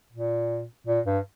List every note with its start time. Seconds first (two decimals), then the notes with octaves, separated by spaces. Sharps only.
0.12 A#2
0.87 A#2
1.05 G2